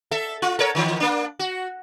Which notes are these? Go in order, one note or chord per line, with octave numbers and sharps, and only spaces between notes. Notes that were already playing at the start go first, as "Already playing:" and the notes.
A4 E5
F4
A4 A#4 C#5
D#3 E3
A#3 D4
F#4